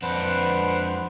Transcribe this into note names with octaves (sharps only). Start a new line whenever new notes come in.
F2 D4 B4 C5 F#5